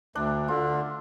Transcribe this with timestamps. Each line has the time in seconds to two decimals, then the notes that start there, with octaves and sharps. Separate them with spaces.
0.15 D2 D4
0.48 D3 F4